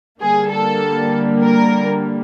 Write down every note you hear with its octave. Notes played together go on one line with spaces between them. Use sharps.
D3 G3 A#3 G#4
A4
A#4